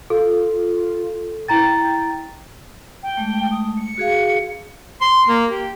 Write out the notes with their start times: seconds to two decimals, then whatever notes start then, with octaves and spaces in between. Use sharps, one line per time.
0.10 F4 A4
1.48 E4 G5 A#5 A6
3.03 G5
3.17 G#3 A3
3.51 D#6
3.77 C#7
3.98 F#4 G#4 F5
5.01 C6
5.28 A#3
5.50 G4